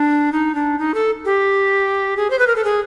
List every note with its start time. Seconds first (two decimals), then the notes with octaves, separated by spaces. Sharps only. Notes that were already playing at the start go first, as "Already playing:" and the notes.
Already playing: D4
0.32 D#4
0.55 D4
0.79 D#4
0.94 A4
1.25 G4
2.17 G#4
2.30 C5
2.39 B4
2.47 A#4
2.56 A4
2.64 G#4